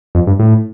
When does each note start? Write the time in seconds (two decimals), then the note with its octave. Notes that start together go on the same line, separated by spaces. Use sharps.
0.15 F2
0.27 G2
0.39 A2